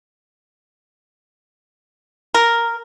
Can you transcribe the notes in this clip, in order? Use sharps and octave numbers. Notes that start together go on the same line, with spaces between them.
A#4